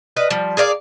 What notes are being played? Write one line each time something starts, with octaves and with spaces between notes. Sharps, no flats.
B4 D#5 F5
F3 G3
G#4 A#4 D5 F5